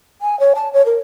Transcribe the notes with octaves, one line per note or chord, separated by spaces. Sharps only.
G#5
C#5
A5
C#5
A#4